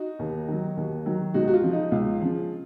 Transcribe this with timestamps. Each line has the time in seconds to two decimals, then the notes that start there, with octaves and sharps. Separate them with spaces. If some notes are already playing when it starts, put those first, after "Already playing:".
Already playing: D#4 F#4
0.19 D#2
0.48 D#3 F#3
0.77 D#2
1.06 D#3 F#3
1.34 C#2 D#4 F#4
1.48 F#4
1.54 F4
1.63 C#3 F3
1.73 D#4
1.92 C#2 F4
2.21 C#3 F3